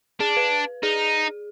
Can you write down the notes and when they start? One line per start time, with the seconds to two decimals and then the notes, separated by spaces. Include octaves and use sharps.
0.20 D4 G#4
0.37 B4
0.83 D#4 G#4